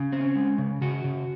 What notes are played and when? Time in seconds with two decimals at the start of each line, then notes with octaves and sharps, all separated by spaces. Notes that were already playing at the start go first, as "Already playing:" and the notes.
Already playing: C#3
0.12 C4
0.21 C#4
0.36 G#3
0.58 C#3
0.81 C#3 F#4
1.04 C#3